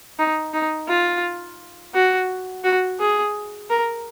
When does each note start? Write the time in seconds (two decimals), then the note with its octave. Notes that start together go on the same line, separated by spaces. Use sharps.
0.19 D#4
0.54 D#4
0.88 F4
1.94 F#4
2.64 F#4
3.00 G#4
3.70 A#4